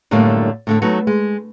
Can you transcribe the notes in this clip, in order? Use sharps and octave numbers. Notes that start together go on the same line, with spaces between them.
F#2 A2 D3 G3 A3 A#3
A2 D3 A3
F#3 A3 B3 D#4
G#3